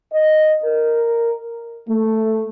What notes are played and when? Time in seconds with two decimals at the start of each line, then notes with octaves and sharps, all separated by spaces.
0.13 D#5
0.64 A#4
1.89 A3